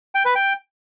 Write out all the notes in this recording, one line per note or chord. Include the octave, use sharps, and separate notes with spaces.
G5
B4
G5